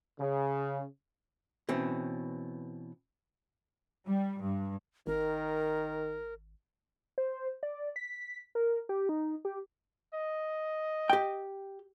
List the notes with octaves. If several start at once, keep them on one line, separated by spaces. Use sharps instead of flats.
C#3
B2 E3 C4 C#4
G3
G2
G#1 D#3 A#4
C5
D5
B6
A#4
G4
D#4
G4
D#5
G4 G5